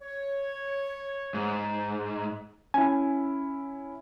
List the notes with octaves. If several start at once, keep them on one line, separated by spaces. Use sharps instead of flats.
C#5
G#2
C#4 E4 G#5